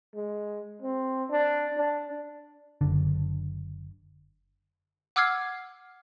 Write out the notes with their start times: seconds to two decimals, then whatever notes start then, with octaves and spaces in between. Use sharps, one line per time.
0.15 G#3
0.82 C4
1.30 D4
1.77 D4
2.81 F#1 D3
5.16 F#5 D6 E6 F6 G#6 C7